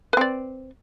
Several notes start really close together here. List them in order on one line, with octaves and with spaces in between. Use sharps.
B4 C4 D5